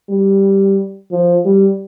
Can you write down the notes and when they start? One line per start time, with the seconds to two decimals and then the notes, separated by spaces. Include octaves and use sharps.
0.09 G3
1.11 F3
1.45 G3